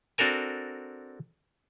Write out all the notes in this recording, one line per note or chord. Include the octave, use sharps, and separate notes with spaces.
C4 D4 F#4 A4 A#4 G#5